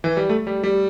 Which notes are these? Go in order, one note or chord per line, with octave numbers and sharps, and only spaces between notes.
E3
G3
A3
G3
G3